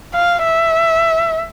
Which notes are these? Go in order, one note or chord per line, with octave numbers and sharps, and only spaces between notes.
F5
E5